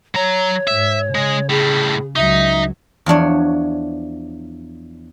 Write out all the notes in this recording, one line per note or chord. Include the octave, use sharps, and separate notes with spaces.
F#3 C#5 A#5
G#2 E5
C#3 G#3
A2 G3 G#4
C#2 F#3 D#4 E5
E2 F3 D4 C#5